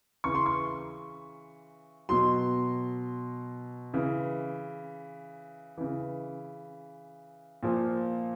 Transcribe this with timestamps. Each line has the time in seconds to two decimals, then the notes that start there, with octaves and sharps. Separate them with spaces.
0.24 C#3 E3 C#6
0.35 C6
0.46 C#6
2.09 B2 F#3 C6
3.94 C#3 E3
5.78 C#3 E3
7.63 A#2 F3